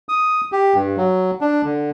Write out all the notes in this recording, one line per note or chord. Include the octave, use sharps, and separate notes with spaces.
D#6
G4
G2
F#3
D4
D3